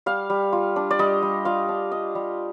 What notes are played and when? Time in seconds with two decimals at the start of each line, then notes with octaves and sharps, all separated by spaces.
0.06 G3 F5
0.30 G3
0.53 F4
0.76 D4
0.91 D5
0.99 G3 D#5
1.22 G3
1.45 F4 F5
1.69 D4
1.92 G3 D#5
2.15 G3